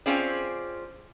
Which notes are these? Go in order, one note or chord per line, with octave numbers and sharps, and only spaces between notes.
C4 C#4 F4 G#4 C5 D5